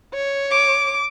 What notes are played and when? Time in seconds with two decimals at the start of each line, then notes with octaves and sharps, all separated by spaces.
0.14 C#5
0.50 D6